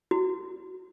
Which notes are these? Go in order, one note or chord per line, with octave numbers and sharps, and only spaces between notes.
F#4